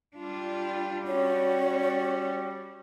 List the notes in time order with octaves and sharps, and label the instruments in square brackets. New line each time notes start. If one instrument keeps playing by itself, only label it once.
[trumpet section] G3 [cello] D4 F4
[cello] C#4 F#4 [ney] C#5